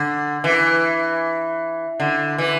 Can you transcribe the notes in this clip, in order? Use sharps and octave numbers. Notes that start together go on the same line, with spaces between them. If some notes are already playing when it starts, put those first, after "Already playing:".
Already playing: D3
E3
D3
E3